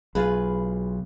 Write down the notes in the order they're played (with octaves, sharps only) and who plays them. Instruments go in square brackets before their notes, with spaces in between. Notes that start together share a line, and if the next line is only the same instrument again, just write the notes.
[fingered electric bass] B1 [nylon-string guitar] F4 G#4 B4